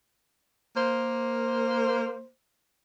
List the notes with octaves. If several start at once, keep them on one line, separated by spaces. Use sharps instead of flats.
A#3 C5